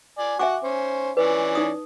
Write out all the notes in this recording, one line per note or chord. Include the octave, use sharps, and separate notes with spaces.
D5 G#5
F#4 E5 F#5 G#5 D6
C#4 C5
E3 C#4 B4 D5
D#4 D#6